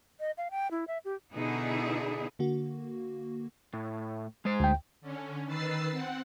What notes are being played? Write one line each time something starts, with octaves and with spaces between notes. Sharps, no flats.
D#5
F5
G5
E4
E5
G4
B2 D3 B3 D#4 E4 G#4
D3 A#3 F#4
A2
G#3 C5
D2 G5
D3 C#4
D#3 B4 E6 A6 C7
C4 F#5